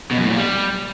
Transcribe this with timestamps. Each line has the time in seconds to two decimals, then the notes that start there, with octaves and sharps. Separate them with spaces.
0.11 B2
0.17 F#2
0.24 A2
0.30 A#2
0.37 G3